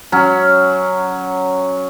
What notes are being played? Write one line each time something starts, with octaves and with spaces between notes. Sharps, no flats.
F#3 C#4